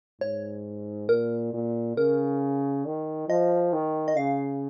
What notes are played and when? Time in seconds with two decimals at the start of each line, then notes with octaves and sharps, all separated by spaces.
0.21 G#2 C#5
1.09 A#2 A#4
1.53 A#2
1.97 C#3 A#4
2.85 D#3
3.29 F3 D#5
3.73 D#3
4.08 D#5
4.17 C#3 F5